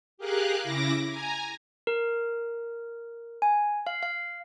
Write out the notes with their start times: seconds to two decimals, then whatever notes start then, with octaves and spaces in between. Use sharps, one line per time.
0.18 G4 G#4 A#4 F5 F#6
0.59 C#3 E4 D6 A#6
1.08 G#5 A#5
1.87 A#4
3.42 G#5
3.87 F5
4.03 F5